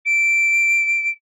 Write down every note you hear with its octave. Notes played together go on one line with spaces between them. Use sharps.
D7